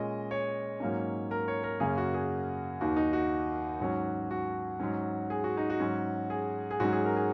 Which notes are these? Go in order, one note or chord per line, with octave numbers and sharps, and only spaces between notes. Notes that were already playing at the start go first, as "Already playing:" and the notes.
Already playing: A#2 G#3 C#4 D#5
C#5
G#2 F#3 A#3 C#4
A#4
C#5
A#4
F#2 C#3 A#3 C#4 G#4
F#4
G#4
D#2 D#3 A#3 F#4
D#4
F#4
G#2 F#3 C#4
F#4
G#2 F#3 C#4
G#4
F#4
D#4
F#4
G#2 F#3 C#4
G#4
G#4
G#2 F#3 C#4 F#4
G#4
A#4
G#4